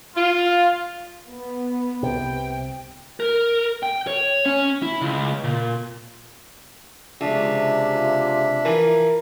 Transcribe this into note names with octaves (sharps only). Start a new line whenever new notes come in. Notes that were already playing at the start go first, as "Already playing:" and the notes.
F4
B3
C2 C3 G5
A#4
G5
C#5
C#4
E4
C#2
A#2
C#2 C3 F3 D4 E5
F4
E3 F3 E4 A#4